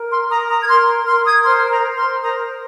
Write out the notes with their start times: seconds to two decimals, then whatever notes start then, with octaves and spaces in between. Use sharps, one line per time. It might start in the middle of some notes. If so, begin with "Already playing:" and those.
Already playing: A#4
0.10 C6 F6
0.30 A#4 A#5 D#6
0.49 A#5 D#6
0.60 G#6
0.68 A#4 C6 F6
1.06 A#4 C6 F6
1.26 D#6 G#6
1.44 C5 C6 F6
1.70 A#5 D#6
1.83 C5
1.96 C6 F6
2.21 A#4 A#5 D#6